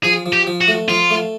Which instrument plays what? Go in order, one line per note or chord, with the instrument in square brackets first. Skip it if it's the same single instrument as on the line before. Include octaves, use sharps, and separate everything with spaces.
[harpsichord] F3 [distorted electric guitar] G#4
[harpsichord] F3
[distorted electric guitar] G4
[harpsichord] F3
[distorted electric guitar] F#4
[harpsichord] A3
[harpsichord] F3 [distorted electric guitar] F4
[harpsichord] A3